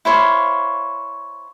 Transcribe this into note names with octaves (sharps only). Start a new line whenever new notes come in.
E4 C5 C#5 F5